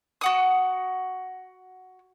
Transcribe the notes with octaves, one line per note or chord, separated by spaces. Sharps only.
F#4 F#5 D#6